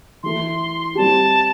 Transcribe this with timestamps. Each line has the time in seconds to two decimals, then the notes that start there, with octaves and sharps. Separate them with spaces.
0.23 E3 A3 E4 C6
0.95 G3 C4 G4 A5